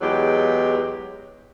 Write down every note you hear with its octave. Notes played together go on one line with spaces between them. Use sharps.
E2 F#3 G#3 G4